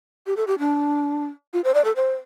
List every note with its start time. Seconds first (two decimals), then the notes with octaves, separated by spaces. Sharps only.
0.27 G4
0.37 A4
0.47 G4
0.59 D4
1.53 F4
1.64 C5
1.74 D5
1.85 A4
1.96 C5